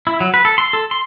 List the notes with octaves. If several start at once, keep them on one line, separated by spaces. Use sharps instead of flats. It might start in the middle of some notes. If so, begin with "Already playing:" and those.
E4
F#3
B4
A4
C6
A4
C6